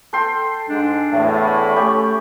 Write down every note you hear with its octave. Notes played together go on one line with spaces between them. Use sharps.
A4 G5 C6
G#2 D4
E2 A2
B5
A3 C#4 G4